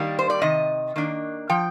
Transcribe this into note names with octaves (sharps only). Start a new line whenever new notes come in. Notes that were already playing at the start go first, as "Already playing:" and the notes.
Already playing: D#3 G3 A#3
C5
D5
C3 D#3 D#5
D#3 A#3 D4
F3 G5